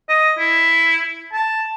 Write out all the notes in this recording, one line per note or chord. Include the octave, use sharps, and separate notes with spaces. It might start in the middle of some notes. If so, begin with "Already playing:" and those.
D#5
E4
A5